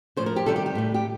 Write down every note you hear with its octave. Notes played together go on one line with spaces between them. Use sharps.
A2 F3 C5
A#4
G4
C3 D#3 G3 A4
G4
G4
A2 G3
G4